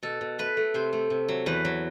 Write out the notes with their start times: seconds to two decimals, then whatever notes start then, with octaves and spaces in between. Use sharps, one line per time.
0.03 B2 A4
0.21 B2
0.39 A3 B4
0.57 A3
0.74 C3 C5
0.93 A3
1.10 C3
1.29 F#3
1.46 E2 B4
1.65 F#3